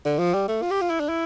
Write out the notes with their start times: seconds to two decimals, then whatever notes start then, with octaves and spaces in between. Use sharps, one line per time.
0.05 D3
0.19 F3
0.34 G3
0.48 A3
0.62 F4
0.71 G4
0.81 F4
0.90 E4
1.00 D4
1.09 E4